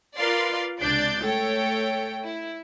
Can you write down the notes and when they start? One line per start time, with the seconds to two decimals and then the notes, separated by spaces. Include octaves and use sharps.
0.16 F4 A#4 B4 D5 F5 C6
0.80 C#2 C3 D4 D5 G6 A6
1.22 A3 A4 C#5 G5
2.25 E4